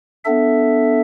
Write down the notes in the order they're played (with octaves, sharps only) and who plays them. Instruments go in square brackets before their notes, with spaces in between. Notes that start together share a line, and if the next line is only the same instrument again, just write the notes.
[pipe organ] B3 D4 A4 E5